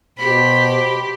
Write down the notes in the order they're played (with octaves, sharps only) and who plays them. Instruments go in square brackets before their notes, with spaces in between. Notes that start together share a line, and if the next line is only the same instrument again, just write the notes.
[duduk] B2 [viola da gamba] G4 [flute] C5 [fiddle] B5